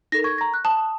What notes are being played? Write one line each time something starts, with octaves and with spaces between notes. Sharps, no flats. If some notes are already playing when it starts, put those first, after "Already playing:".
D#4 A4 A#4 A#6
C#6 G#6
A#5 A#6
F#6
A5 D#6